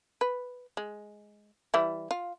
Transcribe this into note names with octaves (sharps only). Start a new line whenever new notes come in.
B4
G#3
E3 G3 E4
F4